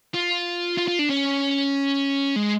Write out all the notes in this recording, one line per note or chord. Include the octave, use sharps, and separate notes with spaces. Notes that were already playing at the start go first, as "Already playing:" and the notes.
F4
F4
F4
D4
C#4
G#3